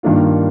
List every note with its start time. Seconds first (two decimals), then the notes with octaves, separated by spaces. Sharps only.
0.03 G2 D#3 A#3 D4 F4